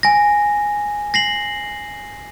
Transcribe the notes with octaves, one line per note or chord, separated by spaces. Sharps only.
G#5 A#6
A#6 C7 F#7